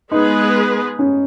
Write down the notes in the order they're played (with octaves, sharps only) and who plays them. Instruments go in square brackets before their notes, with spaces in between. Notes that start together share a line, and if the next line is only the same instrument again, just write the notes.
[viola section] G#3 B3 G#4 B4 [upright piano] D#4
[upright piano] C#4